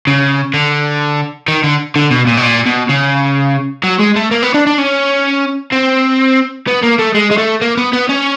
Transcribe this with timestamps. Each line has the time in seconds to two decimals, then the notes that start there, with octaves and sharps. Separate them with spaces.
0.07 C#3
0.54 D3
1.48 D#3
1.64 D3
1.96 D3
2.11 B2
2.27 A#2
2.37 B2
2.43 A#2
2.66 B2
2.90 C#3
3.83 F#3
3.99 G#3
4.16 A3
4.31 A#3
4.43 B3
4.54 D4
4.67 D4
4.78 C#4
5.72 C4
6.67 B3
6.82 A#3
6.98 A3
7.14 G#3
7.31 G#3
7.38 A3
7.61 A#3
7.77 B3
7.93 B3
8.09 C#4